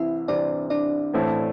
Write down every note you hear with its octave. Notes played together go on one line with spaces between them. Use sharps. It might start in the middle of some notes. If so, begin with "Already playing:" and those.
Already playing: C2 C3 E3 C4 E4 E5
C2 C3 E3 C4 D4 D5
D4 D5
A1 A2 A3 C4 E4